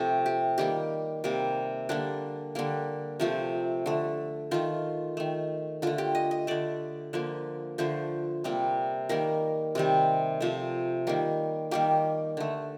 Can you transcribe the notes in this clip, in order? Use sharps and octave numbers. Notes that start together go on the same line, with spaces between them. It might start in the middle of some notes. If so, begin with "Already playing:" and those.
Already playing: C3 F3 A3 G4 A4
G4
D#3 G3 A#3 G4
C3 G3 A#3
D3 G3 A#3 D4
D3 G3 A#3
C3 F3 A3
D3 A3
D#3 A3 F4
D#3 A3
D3 A3 F4
G4
D#5
D#5
D3 A3 D5
D3 F3 A#3
D3 F3 A3 C5
C3 G3 A#3
D#3 G3 A#3 A#4
C3 D#3 G3
C3 F3 A3
D#3 G3 A#3
D#3 G3 A#3 G4
D3 A3